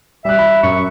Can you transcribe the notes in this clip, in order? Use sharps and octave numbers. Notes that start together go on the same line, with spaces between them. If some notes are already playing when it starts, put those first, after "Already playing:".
G3 E5 F#6
B5
F#2 C#6